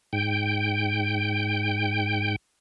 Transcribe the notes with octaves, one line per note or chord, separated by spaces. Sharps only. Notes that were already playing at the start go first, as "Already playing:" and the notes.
G#2 G5